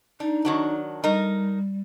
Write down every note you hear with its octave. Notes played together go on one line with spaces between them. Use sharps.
D4 D#4
D#3 F#3 D4
G3 D#4 A#4